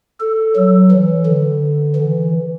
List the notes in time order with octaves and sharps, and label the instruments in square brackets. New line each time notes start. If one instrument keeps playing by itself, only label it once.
[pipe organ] A4
F#3
E3
D3
E3